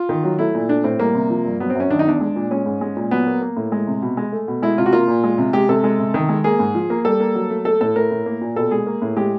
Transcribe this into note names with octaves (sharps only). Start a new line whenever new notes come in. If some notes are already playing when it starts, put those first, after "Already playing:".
Already playing: F4
D#3
F#3
A3 E4
A#2
A3 D4
A2 C4
G3 A#3
C3
F3
G2
F#3 B3
C4
F#2
C#4
D#3 D4
D#4
E2 D4
G#3
A#2
G#3 C#4
G#2
G#3
A#2
F#3 B3
A#3
A#3
A2
G#3
C3
B2
G#3
A3
B2
G#3 E4
C3 F4
F#4
A#3 F4
A#2
G#3
C3
G#3 G4
C3 A4
G#3
C3
D#3
G#3
A#3 G#4
G#2
F3
A#3
G3 A4
A#3
F#3
A3
A3 A4
A2 A4
A3 A#4
A2
A#3
A#2
B2 A4
G#3 G#4
A#3
A2
G#3 G4